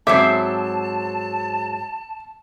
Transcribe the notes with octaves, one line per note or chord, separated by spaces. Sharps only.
G#2 F#3 C4 E5 A5 D6